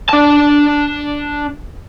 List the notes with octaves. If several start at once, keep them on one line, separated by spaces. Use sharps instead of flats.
D4 A5